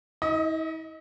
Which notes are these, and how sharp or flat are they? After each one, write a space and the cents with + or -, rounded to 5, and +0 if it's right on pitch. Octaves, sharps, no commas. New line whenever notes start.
E4 -45 D#5 +15